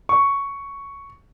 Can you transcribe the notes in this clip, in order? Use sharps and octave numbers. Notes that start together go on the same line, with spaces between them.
C#6